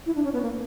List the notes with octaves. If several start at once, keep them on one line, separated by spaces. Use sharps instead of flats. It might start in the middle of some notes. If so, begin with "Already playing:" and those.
E4
D4
C#4
B3
A#3